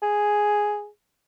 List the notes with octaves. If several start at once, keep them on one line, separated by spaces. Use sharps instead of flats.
G#4